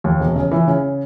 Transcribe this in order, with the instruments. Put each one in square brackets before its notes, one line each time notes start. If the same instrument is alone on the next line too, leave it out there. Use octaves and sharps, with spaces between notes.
[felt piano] D#2
E1
C#3
E3
C#3